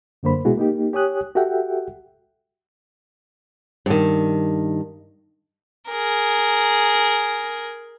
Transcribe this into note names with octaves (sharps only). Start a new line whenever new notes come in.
F#2 D3 A#3 C5 B5
B2 G#3 B3 E4 F#4 G#4
A#3 D#4 G4
G4 C#5 G#5 D#6 F#6
F#4 G4 A4 E5 F#5 G5
G2 D#3
G#4 A#4